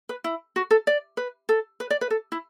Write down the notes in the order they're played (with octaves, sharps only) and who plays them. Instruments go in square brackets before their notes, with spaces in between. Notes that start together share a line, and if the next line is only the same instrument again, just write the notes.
[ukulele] B4
E4
F#4
A4
D5
B4
A4
B4
D5
B4
A4
E4